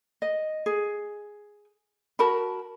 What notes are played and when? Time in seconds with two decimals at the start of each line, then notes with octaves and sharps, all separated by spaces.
0.22 D#5
0.66 G#4
2.19 F#4 A#4 A5 B5